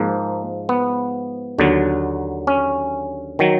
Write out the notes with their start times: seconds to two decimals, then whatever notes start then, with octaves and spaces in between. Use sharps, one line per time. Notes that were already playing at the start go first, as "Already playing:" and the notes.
Already playing: G#2 F3 A#3
0.69 B3
1.58 D#2 D3 F#3
2.47 C#4
3.39 D#3 F#3